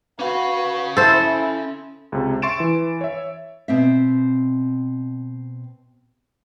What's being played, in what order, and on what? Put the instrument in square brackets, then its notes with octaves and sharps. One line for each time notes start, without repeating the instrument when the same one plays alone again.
[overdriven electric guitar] C#4 F5 [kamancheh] F#4 B4
[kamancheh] E4 [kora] A4 C5
[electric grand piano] C#2 C3
E5 C6 C#6 A6 D7 E7
E3
C#5 E5
[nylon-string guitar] B2 C4 E5